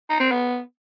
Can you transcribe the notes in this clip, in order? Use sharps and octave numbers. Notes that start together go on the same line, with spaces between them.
D#4
C4
B3